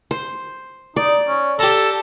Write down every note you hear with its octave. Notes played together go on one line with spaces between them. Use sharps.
C5
D#4 D5
C#4
G4 A4 A5 A#5